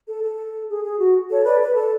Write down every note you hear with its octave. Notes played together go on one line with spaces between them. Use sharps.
A4
A4
G#4
G#4
F#4
A4 C#5
B4 D5
B4
A4